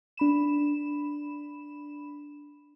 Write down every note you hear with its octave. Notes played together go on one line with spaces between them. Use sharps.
D4 B5 E7